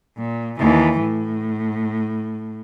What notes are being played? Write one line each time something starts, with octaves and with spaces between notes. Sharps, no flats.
A#2
D#2 E3
A2